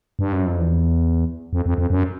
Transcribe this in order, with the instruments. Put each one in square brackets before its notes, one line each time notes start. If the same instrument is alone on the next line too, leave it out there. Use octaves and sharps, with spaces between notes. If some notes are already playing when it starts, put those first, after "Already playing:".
[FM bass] G2
F#2
F2
E2
F2
F2
F2
F#2